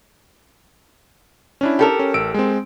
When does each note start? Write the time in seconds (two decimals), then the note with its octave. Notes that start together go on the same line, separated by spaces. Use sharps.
1.61 C#4 D4 E4
1.79 G4 A4 A#4
1.99 C#4
2.14 A1 E6 D7
2.34 G#3 C4